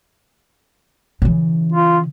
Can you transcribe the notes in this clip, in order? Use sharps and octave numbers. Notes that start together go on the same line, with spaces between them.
C#3 E3
F4